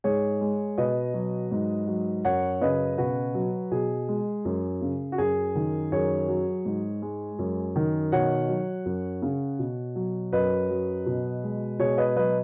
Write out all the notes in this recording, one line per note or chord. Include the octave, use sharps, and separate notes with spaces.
G#2 G#4 C#5
G#3
B2 B4 D#5
F#3
G#2
F#3
F#2 C#5 F#5
C#3 B4 D#5
B2 F#4 B4
F#3
B2 G#4
G#3
F#2
C#3
F#4
F#2 G#4
D#3
F#2 G#4 C#5
F#3
G#2
G#3
F#2
D#3
B2 C#5 F#5
F#3
F#2
C#3
B2
F#3
F#2 B4 D#5
F#3
B2
G#3
B2 G#4 C#5
B4 D#5
F#3 B4 D#5